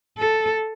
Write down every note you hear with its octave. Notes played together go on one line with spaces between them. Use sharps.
A4